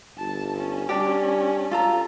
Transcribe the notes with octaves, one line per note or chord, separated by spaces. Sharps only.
G1 A5
C#4
G3 D4 G4
F4 A4 A#5